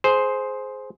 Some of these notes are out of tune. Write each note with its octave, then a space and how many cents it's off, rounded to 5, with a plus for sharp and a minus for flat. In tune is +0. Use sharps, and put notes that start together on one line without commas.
G#4 +20 C5 +0